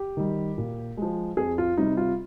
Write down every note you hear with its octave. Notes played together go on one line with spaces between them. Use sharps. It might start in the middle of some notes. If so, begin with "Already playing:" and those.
Already playing: G4
D#3 G3
A#2
F3 G#3
F2 G#4
F4
C3 G3 D#4
F4